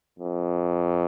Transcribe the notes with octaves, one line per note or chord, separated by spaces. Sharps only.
F2